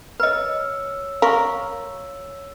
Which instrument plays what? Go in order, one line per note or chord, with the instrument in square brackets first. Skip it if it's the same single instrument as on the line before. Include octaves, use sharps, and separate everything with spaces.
[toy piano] B4 D#5 [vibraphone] C#5 E6
[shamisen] A#4 [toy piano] F5 C6 C#6